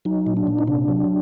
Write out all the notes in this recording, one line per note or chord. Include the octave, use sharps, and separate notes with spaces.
F#3 D#4
A#2
D4
A#2
D#4
C3 D4
F#3